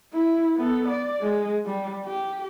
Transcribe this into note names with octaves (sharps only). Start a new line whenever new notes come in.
E4
B3 A4
D5
G#3
G3
G4